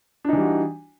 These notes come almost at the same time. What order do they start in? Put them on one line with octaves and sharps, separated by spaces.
D4 D#4 E3 G3 F#4